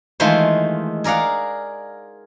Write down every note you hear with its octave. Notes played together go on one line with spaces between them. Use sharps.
D#3 E3 G#3 A3 F4 C5
G#4 A#4 D5 F5 F#5